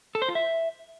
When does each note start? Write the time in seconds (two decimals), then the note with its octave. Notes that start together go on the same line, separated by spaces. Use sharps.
0.15 A4
0.22 C5
0.29 F4
0.35 E5